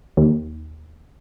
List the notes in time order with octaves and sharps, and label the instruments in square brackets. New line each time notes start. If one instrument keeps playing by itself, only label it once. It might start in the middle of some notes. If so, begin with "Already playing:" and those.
[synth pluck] D#2